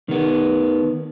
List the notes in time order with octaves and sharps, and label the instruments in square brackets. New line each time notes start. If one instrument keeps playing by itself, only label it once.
[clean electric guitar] D#3 B3